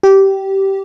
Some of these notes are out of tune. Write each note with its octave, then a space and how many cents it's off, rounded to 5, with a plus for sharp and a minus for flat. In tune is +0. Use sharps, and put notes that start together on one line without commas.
G4 -15